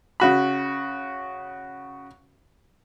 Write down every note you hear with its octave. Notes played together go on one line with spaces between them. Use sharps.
C#3 F#4 B5